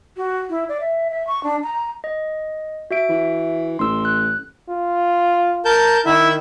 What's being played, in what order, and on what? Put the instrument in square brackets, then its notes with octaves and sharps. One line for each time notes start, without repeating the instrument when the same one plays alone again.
[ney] F#4
E4
D5
E5
E5
C#6
D4
A#5
[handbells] D#5
F#4 E5 D7
[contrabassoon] E3
[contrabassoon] A1 [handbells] C6 E6
[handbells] F#6
[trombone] F4
[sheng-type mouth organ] A#4 A5 G6
[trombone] D#3 [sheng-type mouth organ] E4 E5